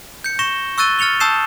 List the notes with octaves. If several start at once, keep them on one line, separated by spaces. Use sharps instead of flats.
G6 C#7
C#6 A#6 E7 G7
C#6 E6 F#6 A6 D#7 G7
F6 A6 C#7 F7 G7
A5 D#6 E6 G6 C7 E7